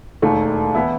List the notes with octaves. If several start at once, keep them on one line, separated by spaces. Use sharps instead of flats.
E1 D#2 D#3 A3
E3 B3 E4